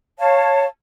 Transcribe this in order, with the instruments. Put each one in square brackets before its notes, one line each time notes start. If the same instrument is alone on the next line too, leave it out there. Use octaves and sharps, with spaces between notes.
[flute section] C#5 F5 A5